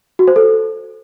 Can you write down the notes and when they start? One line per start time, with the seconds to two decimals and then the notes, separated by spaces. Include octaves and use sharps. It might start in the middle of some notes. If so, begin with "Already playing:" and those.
0.19 F#4
0.28 C5
0.36 A4